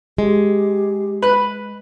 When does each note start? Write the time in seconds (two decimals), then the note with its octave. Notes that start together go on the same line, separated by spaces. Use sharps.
0.18 G#3 G4
1.22 B4 B5 F#6